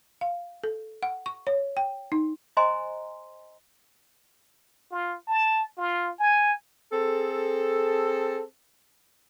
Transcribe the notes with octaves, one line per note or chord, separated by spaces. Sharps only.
F5
A4
F#5
C#6
C#5
G5
D#4
C5 D#5 G#5 A#5 C6
F4
A5
F4
G#5
C4 G#4 A4